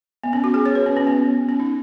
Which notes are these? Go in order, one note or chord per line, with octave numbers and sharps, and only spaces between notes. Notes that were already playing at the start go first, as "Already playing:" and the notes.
B3
C#4
F#4
G#4
C#5
B4
C#4
C#4
B3
C#4
D#4